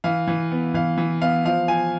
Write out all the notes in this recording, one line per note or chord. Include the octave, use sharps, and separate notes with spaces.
E3 F5
E3
B3
E3 F5
E3
B3 F5
F3 F5
F3 G#5